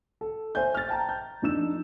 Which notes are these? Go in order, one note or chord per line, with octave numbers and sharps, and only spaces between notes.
A4
C5 E5 G#5 G6
F6 A6
G5 A5 A#5
G6
F2 D4 D#4 E6 E7